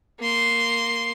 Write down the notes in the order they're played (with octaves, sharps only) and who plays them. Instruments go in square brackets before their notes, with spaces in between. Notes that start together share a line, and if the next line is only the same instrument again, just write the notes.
[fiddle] A#3 C6